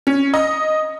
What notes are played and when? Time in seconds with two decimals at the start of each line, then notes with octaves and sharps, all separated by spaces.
0.07 C#4
0.34 D#5